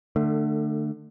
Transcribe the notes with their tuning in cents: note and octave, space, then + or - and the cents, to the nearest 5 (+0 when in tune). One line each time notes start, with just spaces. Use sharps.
D3 +30 A3 +15